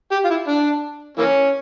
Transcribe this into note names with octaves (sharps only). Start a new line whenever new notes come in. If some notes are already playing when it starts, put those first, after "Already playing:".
G4
F4
E4
D4
E3 A#3 C#4